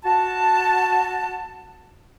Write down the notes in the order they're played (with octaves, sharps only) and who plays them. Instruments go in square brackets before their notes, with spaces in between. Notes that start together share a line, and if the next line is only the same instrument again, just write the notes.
[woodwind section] F#4 A5